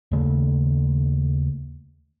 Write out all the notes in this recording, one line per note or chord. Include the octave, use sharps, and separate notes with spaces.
D#2 C#3 A3